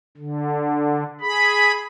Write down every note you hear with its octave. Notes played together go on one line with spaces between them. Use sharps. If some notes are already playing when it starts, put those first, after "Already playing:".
D3
G#4 B5